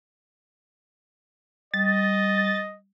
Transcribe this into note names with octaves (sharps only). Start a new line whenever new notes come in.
G3 D#5 A6